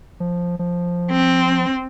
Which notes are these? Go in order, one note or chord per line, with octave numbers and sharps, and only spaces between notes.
F3
F3
C4